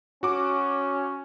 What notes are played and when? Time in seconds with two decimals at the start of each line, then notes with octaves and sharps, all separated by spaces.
0.23 C#4 F#4 D6